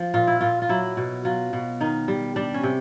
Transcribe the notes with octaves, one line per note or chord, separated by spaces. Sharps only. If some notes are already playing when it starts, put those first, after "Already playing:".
Already playing: F3
A#2 F4
E4
A#2 F4
F4
F#3 E4
B2
F#3 F4
B2
D#3 D#4
G3
G3 D4
C#4
C3